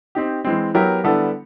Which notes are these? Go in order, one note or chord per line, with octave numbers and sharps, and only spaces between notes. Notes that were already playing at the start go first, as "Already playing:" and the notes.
C4 D#4 G4
E3 G#3 C4
F#3 B3 E4 G4 A#4
D3 G3 B3 E4 A4